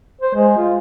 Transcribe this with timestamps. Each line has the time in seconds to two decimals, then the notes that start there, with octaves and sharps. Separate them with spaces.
0.21 C5
0.35 G#3
0.57 F4